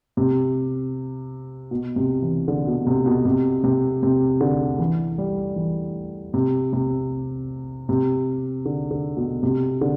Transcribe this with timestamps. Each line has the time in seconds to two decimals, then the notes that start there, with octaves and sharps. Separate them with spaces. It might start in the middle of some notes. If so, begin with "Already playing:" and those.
0.17 C3
1.71 B2
1.96 C3
2.22 E3
2.48 D3
2.67 B2
2.86 C3
3.06 B2
3.25 C3
3.64 C3
4.03 C3
4.40 D3
4.79 E3
5.18 G3
5.56 E3
6.34 C3
6.73 C3
7.89 C3
8.65 D3
8.91 D3
9.17 B2
9.43 C3
9.81 D3